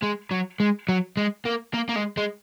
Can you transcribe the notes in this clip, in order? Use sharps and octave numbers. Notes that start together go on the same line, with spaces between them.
G#3
F#3
G#3
F#3
G#3
A#3
A#3
A#3
G#3
G#3